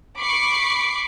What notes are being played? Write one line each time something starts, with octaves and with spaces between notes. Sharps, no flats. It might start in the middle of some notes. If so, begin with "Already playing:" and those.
B5 C#6 D6 C7